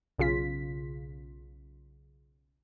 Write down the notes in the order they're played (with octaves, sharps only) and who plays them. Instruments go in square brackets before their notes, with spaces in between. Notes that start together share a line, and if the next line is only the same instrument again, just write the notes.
[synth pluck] B1 C#3 F4 B6